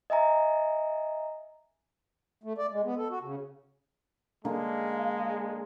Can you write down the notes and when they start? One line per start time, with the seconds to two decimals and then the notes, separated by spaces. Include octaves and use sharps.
0.10 D#5 E5 G#5 A#5
2.43 A3
2.58 D5
2.71 G#3
2.84 B3
2.97 A4
3.10 F#4
3.22 C#3
4.45 D3 G#3 A#3 F5